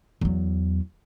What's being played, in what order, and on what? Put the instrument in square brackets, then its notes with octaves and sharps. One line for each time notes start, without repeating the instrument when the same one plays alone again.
[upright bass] E2 F#3